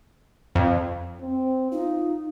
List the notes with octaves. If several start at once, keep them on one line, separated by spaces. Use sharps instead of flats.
F2
C4
D#4 F4